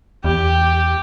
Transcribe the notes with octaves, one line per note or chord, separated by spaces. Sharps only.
E2 G4